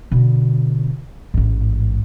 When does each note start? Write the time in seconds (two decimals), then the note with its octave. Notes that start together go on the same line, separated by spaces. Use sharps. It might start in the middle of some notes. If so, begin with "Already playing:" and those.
0.11 B2 D3
1.34 A1 G#2